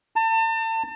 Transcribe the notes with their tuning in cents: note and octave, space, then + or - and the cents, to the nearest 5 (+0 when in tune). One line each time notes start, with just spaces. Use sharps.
A5 +35